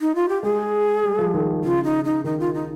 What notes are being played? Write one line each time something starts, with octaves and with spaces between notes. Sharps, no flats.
D#4
F4
G4
G#3 G#4
G3
F3
D#3
C#3 F4
D#4
D#4
D#3 D#4
F4
D#4